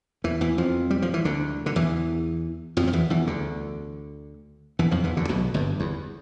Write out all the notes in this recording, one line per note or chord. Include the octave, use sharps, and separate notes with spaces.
E2 E3
E2 E3
F2 F3
G3
F3
E3
D2 D3
D3
E2 E3
F2 F3
F3
E2 E3
E2 E3
D2 D3
E2 E3
F2 F3
E2 E3
D2 D3
B1 B2
G1 G2
E2